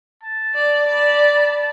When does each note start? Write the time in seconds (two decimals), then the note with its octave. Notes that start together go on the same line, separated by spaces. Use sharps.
0.23 A5
0.54 D5
0.87 D5 B5